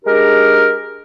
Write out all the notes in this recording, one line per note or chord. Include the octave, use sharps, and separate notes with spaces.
G#3 D4 G4 A#4